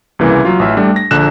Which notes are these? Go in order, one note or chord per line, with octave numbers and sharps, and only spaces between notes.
C2 C#3 E3 A#3
F#3 F4
A1 E5
G3 A3 D4
A#6
A#1 D3 F#6 E7